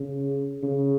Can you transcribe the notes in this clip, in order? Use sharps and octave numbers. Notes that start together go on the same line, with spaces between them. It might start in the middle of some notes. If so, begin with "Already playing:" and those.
Already playing: C#3
C#3